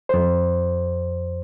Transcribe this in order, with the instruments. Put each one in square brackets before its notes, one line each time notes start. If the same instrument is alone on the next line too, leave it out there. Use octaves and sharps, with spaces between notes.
[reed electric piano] F2 C5